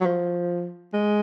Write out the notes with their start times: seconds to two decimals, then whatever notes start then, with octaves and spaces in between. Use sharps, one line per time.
0.01 F#3
0.06 F3
0.93 G#3